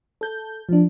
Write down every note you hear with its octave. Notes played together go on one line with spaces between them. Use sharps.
A4 G6
F3 D4